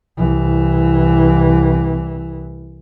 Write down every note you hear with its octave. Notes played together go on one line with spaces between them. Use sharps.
C2 E3